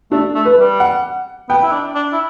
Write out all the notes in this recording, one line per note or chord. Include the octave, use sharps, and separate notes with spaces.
A3 D4
A3
B4
G3
F#5
B3 G5
E4
D4
D4
E4